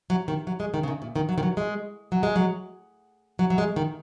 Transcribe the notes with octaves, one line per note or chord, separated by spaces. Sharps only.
F#3
D#3
F#3
G#3
D#3
C#3
D#3
A#2
D#3
F#3
D#3
F#3
G#3
F#3
G#3
F#3
F#3
F#3
G#3
D#3